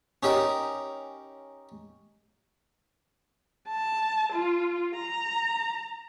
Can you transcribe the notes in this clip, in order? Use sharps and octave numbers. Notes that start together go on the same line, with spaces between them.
C#4 D#4 G4 A#4
A5
F4
A#5